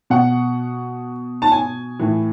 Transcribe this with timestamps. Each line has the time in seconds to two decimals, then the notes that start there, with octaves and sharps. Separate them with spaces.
0.10 B2 F#5
1.42 A5
1.52 G#5
1.99 A2 E3